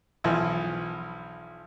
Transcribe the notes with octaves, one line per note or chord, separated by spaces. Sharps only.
B1 E3 F3